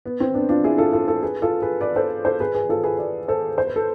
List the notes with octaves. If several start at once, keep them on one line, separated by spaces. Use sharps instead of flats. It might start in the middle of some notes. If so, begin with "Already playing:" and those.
B3
C4
B3 D4
D4 F4
E4 G#4
F4 A4
F4 A4
F4 A4
G#4 B4
F4 A4
G#4 B4
B4 D5
A4 C5
A4 C5
G#4 B4
G#4 B4
F4 A4
G#4 B4
B4 D5
A4 C5
C5
B4
A4